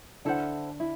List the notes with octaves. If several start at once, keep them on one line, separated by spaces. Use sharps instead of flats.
D3 D4 E4 A4 C5 F#5
E4